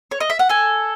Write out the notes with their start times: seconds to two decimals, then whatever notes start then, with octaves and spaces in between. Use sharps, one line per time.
0.11 C#5
0.20 D#5
0.30 E5
0.39 F#5
0.49 A4 G#5